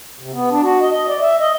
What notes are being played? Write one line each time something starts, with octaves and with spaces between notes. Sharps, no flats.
C3
B3
D4
F#4
D#5
D#5
D5
E5
D#5